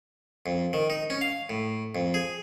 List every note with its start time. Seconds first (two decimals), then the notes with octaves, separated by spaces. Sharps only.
0.46 F2
0.73 D#3
0.90 D#4
1.10 C#4
1.21 F5
1.50 A2
1.95 F2
2.14 G#4